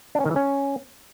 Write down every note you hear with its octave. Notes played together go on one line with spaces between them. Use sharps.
D4
C#4
D#3
E3
C#4